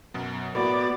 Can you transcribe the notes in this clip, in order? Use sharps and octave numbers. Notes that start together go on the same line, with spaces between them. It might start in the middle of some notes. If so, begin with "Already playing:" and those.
F#2 B2 F#3
A2 A#3 B3 F#4 D5